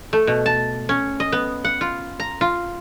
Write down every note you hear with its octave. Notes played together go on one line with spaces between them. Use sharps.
A3
B2
A5
C#4
D#5
B3
F#5
F4
A#5
F4